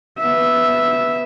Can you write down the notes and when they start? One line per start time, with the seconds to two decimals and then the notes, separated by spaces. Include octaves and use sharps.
0.19 B3 E5